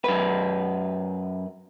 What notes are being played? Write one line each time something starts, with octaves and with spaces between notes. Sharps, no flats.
F#2 B4